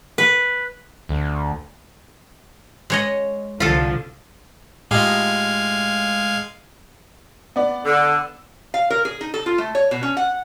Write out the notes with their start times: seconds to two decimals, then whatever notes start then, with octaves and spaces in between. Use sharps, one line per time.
0.18 B4
1.09 D2
2.90 G#3 C#5 D#5
3.60 C2 D3 F3 F4 A4
4.91 A2 G#3 D#4 F4 G4 F5 G#5
7.56 B3 D5
7.85 D3 E6
8.74 F5
8.90 A#4
9.05 G#4
9.21 D#4
9.34 A4
9.46 F4
9.58 A3
9.75 C#5
9.91 B2
10.03 C#4
10.17 F#5